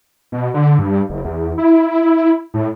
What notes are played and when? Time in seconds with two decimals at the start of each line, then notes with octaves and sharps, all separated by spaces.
0.32 B2
0.54 D3
0.79 G2
1.09 F#1
1.25 E2
1.58 E4
2.54 A2